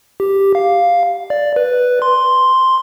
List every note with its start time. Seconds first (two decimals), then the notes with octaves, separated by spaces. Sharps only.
0.20 G4
0.55 F5
1.30 D5
1.56 B4
2.02 C6